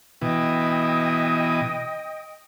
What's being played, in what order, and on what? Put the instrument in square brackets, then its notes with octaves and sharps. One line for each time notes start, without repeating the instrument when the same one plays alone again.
[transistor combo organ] B2 E3 [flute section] D#5 G5 D#6